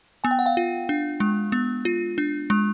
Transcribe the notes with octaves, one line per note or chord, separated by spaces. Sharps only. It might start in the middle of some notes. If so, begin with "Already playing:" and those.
B3 G#5
G5
F#5
F5 G5
F4
D4
G#3
B3
F4
D4
G#3